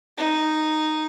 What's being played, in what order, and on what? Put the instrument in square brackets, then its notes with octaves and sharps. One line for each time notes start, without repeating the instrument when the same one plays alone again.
[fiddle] D#4